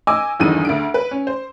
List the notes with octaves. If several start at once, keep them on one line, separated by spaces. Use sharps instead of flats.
D#5 G#5 D6 E6
G#1 E2 G2 D3 D#4 D#7
D2 D3 D7
B4
C#4
C5